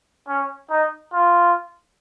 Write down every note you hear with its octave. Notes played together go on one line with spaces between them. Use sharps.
C#4
D#4
F4